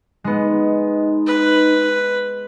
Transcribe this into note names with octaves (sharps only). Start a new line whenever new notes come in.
G#3 B3 D#4
B4